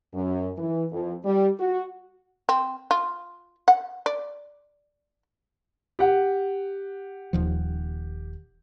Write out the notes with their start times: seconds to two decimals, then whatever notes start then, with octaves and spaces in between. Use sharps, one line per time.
0.14 F#2
0.58 E3
0.93 F2
1.25 G3
1.60 F#4
2.49 C4
2.91 F4
3.68 F#5
4.06 D5
5.99 G4 F#5
7.33 D#1 D#2 F3